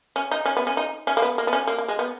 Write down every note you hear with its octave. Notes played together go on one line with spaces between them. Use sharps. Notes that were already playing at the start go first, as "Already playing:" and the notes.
C#4
D#4
C#4
B3
C#4
D#4
C#4
A#3
B3
A#3
B3
C#4
A#3
A#3
G#3
B3